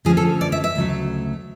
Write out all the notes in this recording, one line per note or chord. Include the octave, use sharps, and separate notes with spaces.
D3 F3 A3 C#4 G#4
A4
D5
E5
E5
D2 C#3 F#3 A3